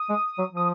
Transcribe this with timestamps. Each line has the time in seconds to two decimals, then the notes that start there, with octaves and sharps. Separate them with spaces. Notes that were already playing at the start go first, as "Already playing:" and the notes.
Already playing: D#6
0.09 G#3
0.38 F#3
0.53 F3 D#6